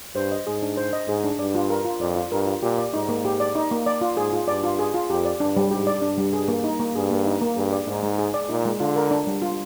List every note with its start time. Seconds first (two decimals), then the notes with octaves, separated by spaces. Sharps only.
0.15 G2 C5
0.31 D#5
0.47 G#2 G#4
0.63 D4
0.77 C5
0.93 D#5
1.08 G#2 G#4
1.24 D4
1.39 G2 D5
1.55 F4
1.70 A#4
1.85 F4
2.00 F2 D5
2.16 F4
2.32 G2 A#4
2.47 F4
2.62 A#2 G4
2.78 D5
2.94 G#2 D#4
3.09 A#3
3.25 G4
3.40 D5
3.55 D#4
3.71 A#3
3.86 D5
4.01 F4
4.17 G#2 G#4
4.33 F4
4.48 G2 D5
4.64 F4
4.79 G#4
4.94 F4
5.10 F2 G4
5.25 D5
5.40 G2 D4
5.57 G3
5.71 G#2 G4
5.87 D5
6.02 G2 D4
6.17 G3
6.33 G#4
6.48 A#3
6.64 D#4
6.79 A#3
6.95 G2 G#4
7.11 A#3
7.26 D#4
7.41 A#3
7.56 G2 G#4
7.72 D5
7.87 G#2 D#4
8.03 G#3
8.19 G#4
8.34 D5
8.49 A#2 D#4
8.65 G#3
8.80 D3 F4
8.96 A#4
9.11 D4
9.27 G3
9.42 F4